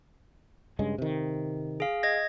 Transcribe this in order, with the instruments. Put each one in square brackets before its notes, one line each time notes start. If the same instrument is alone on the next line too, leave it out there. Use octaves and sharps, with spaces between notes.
[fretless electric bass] G2 C#3 G#3
C3 D#3
[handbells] G#4 F5
D#5 G#6 A#6